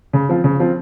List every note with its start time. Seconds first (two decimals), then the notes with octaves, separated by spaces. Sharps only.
0.13 C#3
0.29 F3 C4 F4
0.44 C#3
0.60 F3 C4 F4